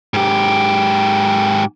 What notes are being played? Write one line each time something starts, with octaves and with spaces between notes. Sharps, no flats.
G#2 G4